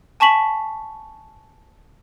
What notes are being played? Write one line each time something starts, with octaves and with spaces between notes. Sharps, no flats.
G#5 A5 C#6 B6 F#7